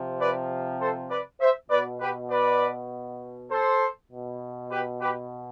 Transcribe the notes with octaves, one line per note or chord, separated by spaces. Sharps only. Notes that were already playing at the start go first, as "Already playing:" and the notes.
Already playing: C3 F3
B4 D5
A4 C5
B4 D5
C5 E5
B2 B4 D5
G4 B4
B4 D5
A4 C5
B2
G4 B4
G4 B4